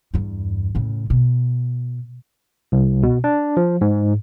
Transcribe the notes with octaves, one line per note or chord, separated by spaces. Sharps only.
E2 G2
A2 C#3
B2
C2
B2
D4
F3
G#2